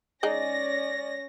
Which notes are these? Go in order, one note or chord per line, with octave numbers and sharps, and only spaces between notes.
G#3 C#4 D#4 G#4 D5 A#6